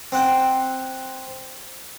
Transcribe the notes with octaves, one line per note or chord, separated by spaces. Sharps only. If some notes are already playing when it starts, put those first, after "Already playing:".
C4 F#5 G5